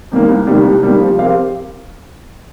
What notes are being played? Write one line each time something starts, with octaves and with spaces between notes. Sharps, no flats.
C3 D#3 G3 A#3
C2
C3 D#3 G3 A#3
C2
C3 D#3 G3 A#3
F3
C4 G4 A#4 F5